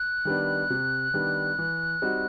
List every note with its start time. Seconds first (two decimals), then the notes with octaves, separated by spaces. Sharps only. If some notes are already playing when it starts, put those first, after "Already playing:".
Already playing: F#6
0.25 D#3 G3 B3 D4
0.70 C3
1.14 D#3 G3 B3 D4
1.58 E3
2.02 G3 C4 D#4 F#4